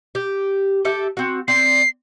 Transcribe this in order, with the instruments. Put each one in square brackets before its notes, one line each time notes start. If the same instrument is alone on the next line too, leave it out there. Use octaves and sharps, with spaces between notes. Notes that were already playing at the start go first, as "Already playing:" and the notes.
[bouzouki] G4
G4 A4 E5
C4 F#4
[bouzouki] C4 D5 [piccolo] C7